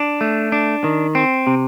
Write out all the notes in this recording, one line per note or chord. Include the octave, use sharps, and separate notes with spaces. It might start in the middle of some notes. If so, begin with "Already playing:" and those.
Already playing: D4
A3
D4
D#3
C4
C3